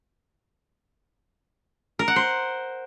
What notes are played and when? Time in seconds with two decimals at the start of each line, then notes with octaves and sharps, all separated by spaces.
1.99 A#4
2.08 F#5
2.16 C5